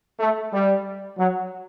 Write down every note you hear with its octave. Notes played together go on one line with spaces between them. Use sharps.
A3
G3
F#3